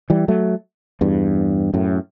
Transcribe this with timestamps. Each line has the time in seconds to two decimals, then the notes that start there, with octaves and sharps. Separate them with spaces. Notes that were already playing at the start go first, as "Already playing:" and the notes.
0.10 E3 G3
0.28 F#3 A3
1.01 E2 G2
1.74 F#2 A2